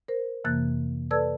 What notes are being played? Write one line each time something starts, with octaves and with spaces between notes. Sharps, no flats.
A#4 C5
F2 C3 E3 A#3 F#6 A6
A4 B4 D5 A5 E6 G#6